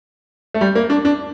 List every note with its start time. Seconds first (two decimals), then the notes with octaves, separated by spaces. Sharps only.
0.54 A3
0.61 G3
0.75 A#3
0.90 D4
1.05 D4